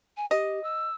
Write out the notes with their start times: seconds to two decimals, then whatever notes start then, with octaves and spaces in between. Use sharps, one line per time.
0.17 G#5
0.31 G4 D#5
0.64 E6